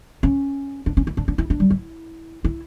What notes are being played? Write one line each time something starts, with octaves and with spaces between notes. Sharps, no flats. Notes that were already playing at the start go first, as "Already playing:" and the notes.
C#4
D4
C#4
E4
D4
D4
E4
D4
G3
E4
E4